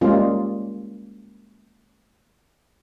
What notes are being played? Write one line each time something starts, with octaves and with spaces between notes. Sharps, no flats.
G3 G#3 A#3 C#4 F4